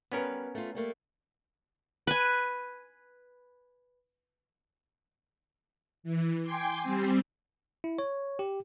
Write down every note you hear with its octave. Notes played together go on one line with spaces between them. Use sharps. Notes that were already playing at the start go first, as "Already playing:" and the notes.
G3 B3 C#4 A#4 B4
A3 F4
G3 A3 A#3
B4 G#5
E3
G5 G#5 C6 D6
G3 C4
E4
C#5
G4